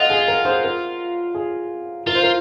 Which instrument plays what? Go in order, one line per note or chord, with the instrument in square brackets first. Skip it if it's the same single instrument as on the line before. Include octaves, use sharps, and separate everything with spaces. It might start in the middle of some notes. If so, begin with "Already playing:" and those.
Already playing: [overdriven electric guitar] F4 [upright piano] D#5 F5 F#5
[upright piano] G#4
A#4
G#4 C5
A#4
G#4
[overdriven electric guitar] F4 [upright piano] A#4
[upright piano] C5
A#4